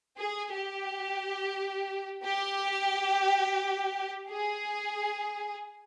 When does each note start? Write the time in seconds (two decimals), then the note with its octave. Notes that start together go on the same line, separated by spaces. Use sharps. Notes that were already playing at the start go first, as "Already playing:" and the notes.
0.17 G#4
0.52 G4
2.24 G4
4.31 G#4